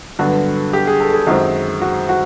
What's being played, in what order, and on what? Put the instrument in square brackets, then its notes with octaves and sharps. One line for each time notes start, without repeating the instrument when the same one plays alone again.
[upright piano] G2 D3 F#3 B3 F#4
G4
G#4
A4
G#4
F#2 D#3 G#3 C4 F#4
F#4
F#4